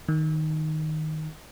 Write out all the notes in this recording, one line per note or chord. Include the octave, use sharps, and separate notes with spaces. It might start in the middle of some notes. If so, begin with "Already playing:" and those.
D#3